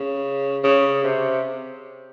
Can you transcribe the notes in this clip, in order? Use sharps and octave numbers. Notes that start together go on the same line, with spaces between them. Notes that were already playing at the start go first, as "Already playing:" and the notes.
Already playing: C#3
C#3
C3